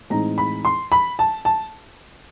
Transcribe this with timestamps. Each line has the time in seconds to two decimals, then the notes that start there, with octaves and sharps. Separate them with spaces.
0.10 A2 E3 G#3 C4 D#4 A#5
0.38 B5
0.65 C6
0.92 B5
1.19 A5
1.45 A5